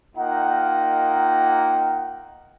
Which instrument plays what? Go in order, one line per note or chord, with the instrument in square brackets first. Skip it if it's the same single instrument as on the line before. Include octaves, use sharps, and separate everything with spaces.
[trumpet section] A#3 D#4 F4 A#4 F#5 G5